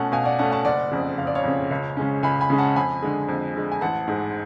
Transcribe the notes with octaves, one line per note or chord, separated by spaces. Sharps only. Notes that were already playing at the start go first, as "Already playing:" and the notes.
Already playing: B2 A3 C#4 F#5 A5
B2 F5 G#5
D5 F#5
A3 C#4 F#5 A5
F#5 A5
F#1 D5 F#5
F2 C#3
F#1 F5
D5
C#5 F5
F2 C#3
C#2
C#3 G#3 C#4
C#2 G#5 B5
G#5 B5
C#3 G#3 C#4
F#5 A5
F2 G#5 B5
D3 G#3
F2
D3 G#3
G#5
A1 F#5 A5
G#2 G#3